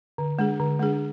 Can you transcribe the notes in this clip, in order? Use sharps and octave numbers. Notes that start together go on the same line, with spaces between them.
D3
G#3 D4 G#4
D3
G#3 D4 G#4